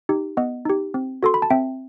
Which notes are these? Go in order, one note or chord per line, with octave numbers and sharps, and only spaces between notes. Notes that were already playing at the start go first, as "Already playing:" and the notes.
D#4 G4
B3 D#5 F#5
D#4 G4
C4
F#4 A4 C6
B5
A5
C4 E5 G5